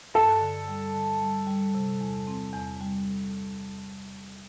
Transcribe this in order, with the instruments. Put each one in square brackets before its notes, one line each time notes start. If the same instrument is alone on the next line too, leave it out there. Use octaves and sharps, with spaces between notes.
[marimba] G2 [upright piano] A4
[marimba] D3
G3
D3
G3
G3
C3
E2
C4
E2
G3